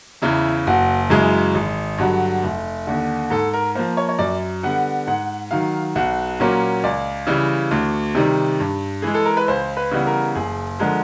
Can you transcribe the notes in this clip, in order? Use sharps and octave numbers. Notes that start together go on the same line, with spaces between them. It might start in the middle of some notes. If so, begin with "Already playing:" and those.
E2 C#3 E3 E4
F#1 F#4
F#2 C#3 E3 G#3 G#4
G#1
G2 D3 F#3
F1
D#2 D3
G#2 A4
A#4
F3 A#3 C5
C#5
C#5
F#2 D5
D3 G3 B3 F#5
G#2 F#5
D#3 F#3 F5
B1 F#5
A#2 F#3 A#3 C#4
C#2 D5
C#3 E3 G3
D2
C3 D#3 G3
G2
E3 G#3 G#4
A4
A#4
B4
C#2 C5
B4
C#3 E3 G3 B3
A#4
F#1 G#4
D3 F3 G#3 A#4